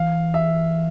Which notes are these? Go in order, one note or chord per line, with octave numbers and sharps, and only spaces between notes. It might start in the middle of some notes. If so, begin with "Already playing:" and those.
Already playing: E3 F5
E5